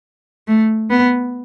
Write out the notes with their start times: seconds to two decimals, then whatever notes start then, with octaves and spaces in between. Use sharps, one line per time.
0.48 A3
0.90 B3